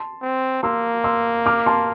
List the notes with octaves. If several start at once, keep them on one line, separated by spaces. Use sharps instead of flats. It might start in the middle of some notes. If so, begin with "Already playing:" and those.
Already playing: A5 C6
C4
A#3 C6 E6
C6 E6
D6 F6
A5 C6